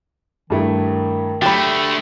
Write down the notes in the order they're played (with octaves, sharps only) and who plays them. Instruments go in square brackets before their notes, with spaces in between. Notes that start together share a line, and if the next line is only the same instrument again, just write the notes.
[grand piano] G2 A3 E4 [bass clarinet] D#3
[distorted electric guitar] D3 A3 [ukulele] G4 B5 [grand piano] A6